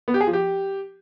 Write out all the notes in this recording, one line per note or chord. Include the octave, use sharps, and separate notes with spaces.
B3
G4
G#4
F3
G4